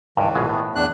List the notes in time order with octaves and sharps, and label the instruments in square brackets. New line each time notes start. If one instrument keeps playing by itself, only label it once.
[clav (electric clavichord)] C#2 G2 [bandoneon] D#3 E3
[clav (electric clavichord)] A#1 B2 G#3
A2 B3
[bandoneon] E2 D4 F#6